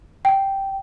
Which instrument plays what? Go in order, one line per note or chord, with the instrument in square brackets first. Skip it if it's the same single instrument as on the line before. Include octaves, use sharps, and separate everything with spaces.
[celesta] G5